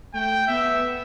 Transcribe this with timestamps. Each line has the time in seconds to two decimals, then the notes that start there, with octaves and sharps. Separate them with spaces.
0.14 A3 G5
0.47 B3 E5